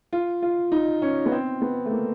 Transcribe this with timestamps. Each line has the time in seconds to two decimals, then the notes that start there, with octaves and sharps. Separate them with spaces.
0.13 F4
0.42 F4
0.72 D#4
1.02 C#4
1.26 B3
1.32 C4
1.62 B3
1.86 A3
1.91 A#3